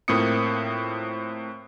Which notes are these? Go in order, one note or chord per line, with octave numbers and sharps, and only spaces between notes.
A2 A#3 C4 F4 D#6 C#7